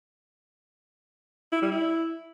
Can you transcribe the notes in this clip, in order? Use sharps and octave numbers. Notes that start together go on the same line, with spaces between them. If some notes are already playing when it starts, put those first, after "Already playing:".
E4
G3
E4